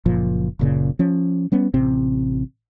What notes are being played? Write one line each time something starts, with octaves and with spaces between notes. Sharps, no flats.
F#1 A#2 F3
F#1 A#2 C#3
F3 C#4
G3 B3 C#4
A1 C3 C4